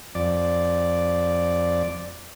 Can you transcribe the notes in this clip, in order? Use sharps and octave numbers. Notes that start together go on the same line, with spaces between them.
F2 D5